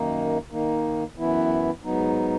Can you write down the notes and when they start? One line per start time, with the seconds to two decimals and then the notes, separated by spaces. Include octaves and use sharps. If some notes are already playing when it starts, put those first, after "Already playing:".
Already playing: F#2 D#3 A#3 D#4
0.51 D#3 A#3 D#4
1.17 F#2 E3 B3 E4
1.84 G#2 F#3 B3 D#4